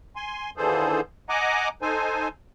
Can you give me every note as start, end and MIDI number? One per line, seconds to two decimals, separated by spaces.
0.16 0.50 80
0.16 0.50 84
0.57 1.01 39
0.57 1.01 50
0.57 1.01 52
0.57 1.01 68
0.57 1.01 69
0.57 1.01 72
1.29 1.68 75
1.29 1.68 78
1.29 1.68 80
1.29 1.68 82
1.29 1.68 86
1.82 2.28 63
1.82 2.28 69
1.82 2.28 72
1.82 2.28 80